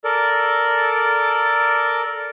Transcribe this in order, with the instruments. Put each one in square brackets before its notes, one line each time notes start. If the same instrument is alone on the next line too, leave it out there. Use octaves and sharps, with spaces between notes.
[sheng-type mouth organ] A4 A#4 D5